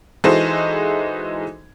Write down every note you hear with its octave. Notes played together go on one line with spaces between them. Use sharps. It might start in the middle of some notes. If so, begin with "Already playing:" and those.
E3 G#3 D#4 F#4 A4 C5